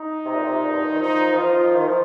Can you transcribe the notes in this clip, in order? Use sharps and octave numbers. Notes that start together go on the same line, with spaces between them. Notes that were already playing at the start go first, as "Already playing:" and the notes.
Already playing: D#4
C3
A#2
C3
A#2
G2
A#2
D#3
F3 D#4
D#3
F3 F4
D#3
F3